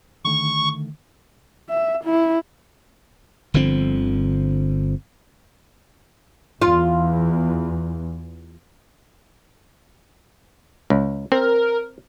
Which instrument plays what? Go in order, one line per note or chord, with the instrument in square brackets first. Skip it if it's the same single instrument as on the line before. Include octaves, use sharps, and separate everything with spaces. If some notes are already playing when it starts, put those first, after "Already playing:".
[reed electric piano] D3 D#3 A3 [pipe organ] C#6
[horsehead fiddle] E5
E4
[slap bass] G1 D3 F3 C4
[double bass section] E2 [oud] F4
[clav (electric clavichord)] C#2
[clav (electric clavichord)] C4 [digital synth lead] A#4